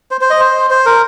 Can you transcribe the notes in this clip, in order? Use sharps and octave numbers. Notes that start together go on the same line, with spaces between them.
C5
C5
D#5
C5
C5
A#4